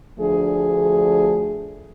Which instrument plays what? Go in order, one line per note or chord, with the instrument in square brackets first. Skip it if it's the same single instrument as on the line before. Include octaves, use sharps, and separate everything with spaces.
[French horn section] D2 F3 A3 D4 G#4